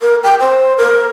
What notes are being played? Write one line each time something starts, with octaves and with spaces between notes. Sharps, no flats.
A#4
G5
C5
A#4